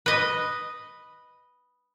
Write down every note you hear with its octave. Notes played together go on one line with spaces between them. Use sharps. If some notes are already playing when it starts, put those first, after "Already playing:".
B4 D#5